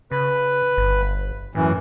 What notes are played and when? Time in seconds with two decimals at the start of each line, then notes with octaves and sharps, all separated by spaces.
0.11 C#3 B4
0.77 G1
1.55 F#2 A2 E3